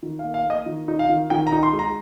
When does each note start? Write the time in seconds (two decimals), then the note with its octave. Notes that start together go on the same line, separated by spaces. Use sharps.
0.03 D#3
0.19 F5
0.24 A#3
0.34 F5
0.45 A#3
0.50 D#5
0.66 D#3
0.88 D#4
0.99 F5
1.09 D#3
1.30 D#3 G5
1.47 A#5
1.52 D#4
1.63 C6
1.73 G#3
1.79 A#5